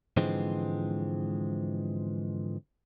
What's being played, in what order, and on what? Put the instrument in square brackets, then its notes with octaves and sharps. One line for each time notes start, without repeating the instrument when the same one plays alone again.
[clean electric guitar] G#2 D3 E3 F3 G#3 C4